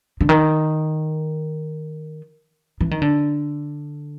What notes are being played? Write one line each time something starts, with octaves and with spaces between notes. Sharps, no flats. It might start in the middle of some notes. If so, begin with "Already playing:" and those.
D3
D#3
E3
D#3
D3